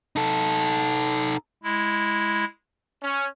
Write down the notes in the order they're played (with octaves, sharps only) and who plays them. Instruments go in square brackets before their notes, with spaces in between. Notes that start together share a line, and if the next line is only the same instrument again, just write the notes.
[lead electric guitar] D#4 A4
[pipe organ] G#3 E4
[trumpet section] C#4